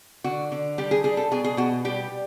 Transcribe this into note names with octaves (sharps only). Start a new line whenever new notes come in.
D3 F#4
D3
G3 G4
G#4
G3 G#4
A4
B2 G#4
G#4
B2 F#4
G3 G4